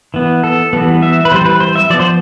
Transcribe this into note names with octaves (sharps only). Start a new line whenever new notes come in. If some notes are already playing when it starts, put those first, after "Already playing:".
E3 B3
A4
E3 G3 B3
E5
B4
E3 G3 C4 C5
B4
C5
E5
F3 B3 D5
C5